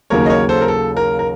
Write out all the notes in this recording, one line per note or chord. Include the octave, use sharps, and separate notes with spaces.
D#2 C#3 F#3 A#3 A#4 C#5
D#5
A#4 C#5
A4 C5
A#4
A4
A#4
A#4